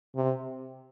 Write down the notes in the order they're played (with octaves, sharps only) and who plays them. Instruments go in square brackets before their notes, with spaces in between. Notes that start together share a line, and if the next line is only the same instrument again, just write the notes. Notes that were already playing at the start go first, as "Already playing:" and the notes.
[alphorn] C3